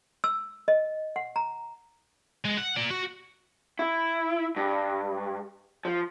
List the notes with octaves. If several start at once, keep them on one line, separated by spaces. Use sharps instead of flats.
E6
D#5
F#5
A#5
G#3
F#5
A#3 D5
F#4
E4
G2
F3